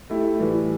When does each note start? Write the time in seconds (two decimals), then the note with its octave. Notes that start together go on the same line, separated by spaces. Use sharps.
0.10 A3 E4 G4
0.39 A2 E3 G3